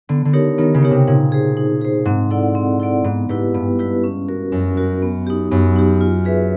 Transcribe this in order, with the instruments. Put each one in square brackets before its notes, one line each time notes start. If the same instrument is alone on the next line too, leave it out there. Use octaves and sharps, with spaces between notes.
[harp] D3 [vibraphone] B3
[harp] D3
[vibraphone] D#4 G4 A#4 C#5
[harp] D#3 [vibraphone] B3
[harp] C#3
[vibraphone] D#4 G4 A#4 C#5
[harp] C3
[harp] A#2 [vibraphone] D#4
[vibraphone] G#4 C5
D#4
G#4 C5
[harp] G#2 [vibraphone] C4
[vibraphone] E4 A4 D5 F#5
C4
E4 A4 D5 F#5
[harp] G#2 [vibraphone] B3
[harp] G#2 [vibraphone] E4 G4 B4
[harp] G2 [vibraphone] B3
[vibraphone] E4 G4 B4
C#4
F#4 A#4
[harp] F#2 [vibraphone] C#4
[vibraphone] F#4 A#4
B3
D#4 G4
[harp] F#2 [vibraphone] B3
[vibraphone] D#4 G4
F4
G#4 B4 E5